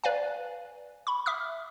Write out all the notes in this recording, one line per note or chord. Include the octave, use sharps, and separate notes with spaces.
B4 D5 F5 G#5
B5 C#6
E5 D6 D#6 F6